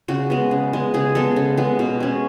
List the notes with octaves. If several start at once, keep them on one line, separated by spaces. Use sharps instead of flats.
C#3 F#4
G#3 B3
C#3
G#3 B3
C#3 G#4
G#3 B3 A4
C#3
G#3 B3
B2
G#3 C#4